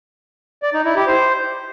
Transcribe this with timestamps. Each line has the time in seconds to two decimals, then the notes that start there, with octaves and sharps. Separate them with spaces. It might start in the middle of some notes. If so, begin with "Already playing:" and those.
0.63 D5
0.74 D#4
0.85 E4
0.96 G4
1.07 C5